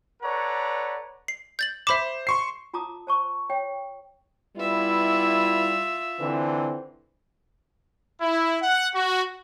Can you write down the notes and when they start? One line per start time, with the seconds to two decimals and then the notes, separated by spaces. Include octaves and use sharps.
0.22 A4 B4 C#5 D5 F#5 A#5
1.28 C7
1.59 G6 A6 F#7
1.87 C5 E5 B5 D6 E7
2.27 C6 C#6 C7
2.74 F4 A5 A#5 D6 D#6
3.07 C5 A5 C#6
3.50 C#5 G5
4.56 G3 B3 E4 F4 E5
6.20 D3 E3 C4
8.21 E4
8.61 F#5
8.94 F#4